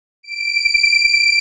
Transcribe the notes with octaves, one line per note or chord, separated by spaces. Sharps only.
D7